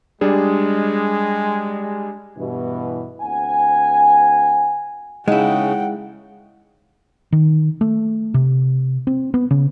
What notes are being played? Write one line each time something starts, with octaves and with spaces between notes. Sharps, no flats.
G3 G#3 D4 G#4
G2 B2 E3
D2 C4 F#5 G#5
C#3 G#3 D#4 E4 F#5 G5
D#3
A3
C3
C4
B3
C#3